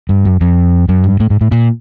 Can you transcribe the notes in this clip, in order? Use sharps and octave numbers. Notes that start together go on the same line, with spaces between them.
G2
F#2
F2
F#2
G2
A2
G#2
A2
A#2